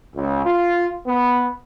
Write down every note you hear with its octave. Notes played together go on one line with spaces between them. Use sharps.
C#2
F4
B3